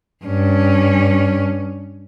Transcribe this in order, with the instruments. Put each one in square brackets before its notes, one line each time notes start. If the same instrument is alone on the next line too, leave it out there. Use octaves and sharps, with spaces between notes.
[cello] G2 C#4